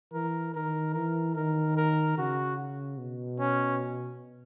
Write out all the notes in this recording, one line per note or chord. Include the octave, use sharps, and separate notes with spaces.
E3 A#4
D#3 A#4
E3 A#4
D#3 A#4
A#4
C#3 F#4
B2
C#4